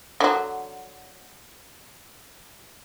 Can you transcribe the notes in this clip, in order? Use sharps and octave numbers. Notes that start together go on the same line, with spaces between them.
D3 F#3